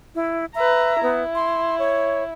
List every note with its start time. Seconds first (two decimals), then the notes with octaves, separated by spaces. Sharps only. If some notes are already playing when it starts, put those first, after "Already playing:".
0.15 E4
0.55 B4 E5 A#5
1.03 B3 E4
1.35 C6
1.79 C#5